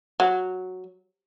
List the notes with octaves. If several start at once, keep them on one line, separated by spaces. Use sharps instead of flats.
F#3